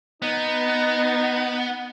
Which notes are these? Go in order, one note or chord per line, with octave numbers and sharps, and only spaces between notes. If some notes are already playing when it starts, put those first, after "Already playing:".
B3 D#4